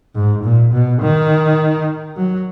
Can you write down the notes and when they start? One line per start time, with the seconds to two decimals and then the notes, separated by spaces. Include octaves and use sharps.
0.15 G#2
0.44 A#2
0.73 B2
1.01 D#3
2.17 F#3